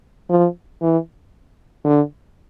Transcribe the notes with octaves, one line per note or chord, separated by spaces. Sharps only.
F3
E3
D3